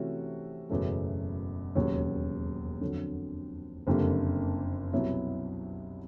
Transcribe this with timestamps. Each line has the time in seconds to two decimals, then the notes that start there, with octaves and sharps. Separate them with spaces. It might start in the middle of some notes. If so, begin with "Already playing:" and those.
Already playing: C3 E3 A3 C#4 F#4
0.70 F#1 E2 B2 F#3 A3
1.75 E1 D#2 C#3 F#3
2.81 F2 D3 F#3
3.87 F#1 F2 D3 G3 A#3
4.92 C2 B2 F#3 B3 E4